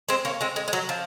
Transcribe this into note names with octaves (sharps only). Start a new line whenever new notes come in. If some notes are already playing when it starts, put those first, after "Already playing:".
G#3 C4
A#3 C#4
G#3 C4
G#3
G#3
F#3
F3